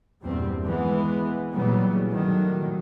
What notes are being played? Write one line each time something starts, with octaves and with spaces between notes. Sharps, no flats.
E2 G2 A#2 G3 C4
E3 G#3 B3
A#2 C#3 E3 F#3 G3 B3
A2 D#3 F#3 G3